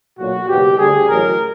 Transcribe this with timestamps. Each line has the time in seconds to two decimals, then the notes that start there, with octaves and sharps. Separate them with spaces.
0.18 B1 A#2 F#3 F#4
0.48 F#1 E2 B2 G4
0.78 D2 D3 G3 G#4
1.08 A1 A2 F#3 A#4